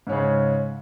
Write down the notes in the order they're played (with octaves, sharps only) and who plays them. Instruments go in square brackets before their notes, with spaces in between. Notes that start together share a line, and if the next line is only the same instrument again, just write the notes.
[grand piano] G#2
C#4
C#3